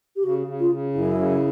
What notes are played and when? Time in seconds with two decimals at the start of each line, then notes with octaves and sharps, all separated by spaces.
0.16 G4
0.24 C#3 F#4
0.47 C#3
0.59 F4
0.71 C#3
0.95 F#2 E4
1.18 C#3